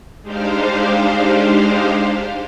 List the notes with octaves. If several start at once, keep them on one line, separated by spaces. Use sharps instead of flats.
G#3 D4 D#4 G4 C5 F5